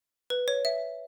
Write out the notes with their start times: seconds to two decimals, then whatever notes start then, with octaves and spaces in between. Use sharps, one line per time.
0.30 B4
0.48 C#5
0.65 E5